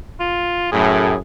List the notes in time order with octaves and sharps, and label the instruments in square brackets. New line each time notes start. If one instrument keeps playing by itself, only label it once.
[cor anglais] F4
[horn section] F#2 A2 [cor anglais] G#4